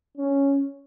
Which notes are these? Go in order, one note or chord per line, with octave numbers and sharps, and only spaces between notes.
C#4